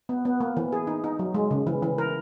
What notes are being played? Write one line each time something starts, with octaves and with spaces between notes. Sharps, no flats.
B3
B3
A#3
E3
G#4
D#4
D#4
F#3
G#3
C#3
E3
E3
A#4